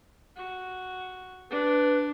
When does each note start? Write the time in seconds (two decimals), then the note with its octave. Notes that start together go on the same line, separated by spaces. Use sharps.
0.37 F#4
1.51 D4 B4